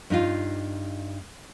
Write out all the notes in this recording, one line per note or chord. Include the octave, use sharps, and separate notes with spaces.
G2 D#4 F4